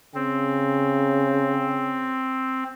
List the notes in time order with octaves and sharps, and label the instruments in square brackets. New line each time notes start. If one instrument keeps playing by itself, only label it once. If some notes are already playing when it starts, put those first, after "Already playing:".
[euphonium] C#3 [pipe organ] C4